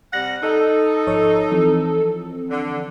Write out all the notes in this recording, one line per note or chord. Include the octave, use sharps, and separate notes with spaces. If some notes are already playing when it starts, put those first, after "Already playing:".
C3 G3 F#5 A#6
D#4 A4
G#1 F3 C#5
E3 F3 C4
D3